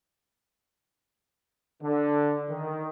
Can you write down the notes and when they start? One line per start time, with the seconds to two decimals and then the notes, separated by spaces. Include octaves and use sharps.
1.82 D3
2.49 D#3